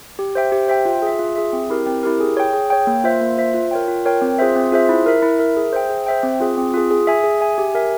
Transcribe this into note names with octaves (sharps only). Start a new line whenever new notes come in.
G4
C5 E5 G5
G4
C5 E5 G5
F4
G#4 E5
F4
G#4 E5
C4
E4 G4 A#4
C4
E4 G4 A#4
G#4
C#5 G5
G#4
C#5 G5
A#3
F4 C5 E5
A#3
F4 C5 E5
F4
A#4 C#5 G5
F4
A#4 C#5 G5
C4
F4 G#4 C5 E5
C4
F4 G#4 C5 E5
E4
A#4 E5
E4
A#4 E5
G#4
C5 E5 G5
G#4
C5 E5 G5
C4
F4 G#4
C4
F4 G#4
G#4
E5 G#5
G#4
E5 G#5
G4
A#4 E5 G#5